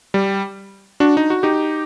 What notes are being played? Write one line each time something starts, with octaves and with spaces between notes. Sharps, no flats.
G3
D4 F#4
D#4
F#4
D#4 G4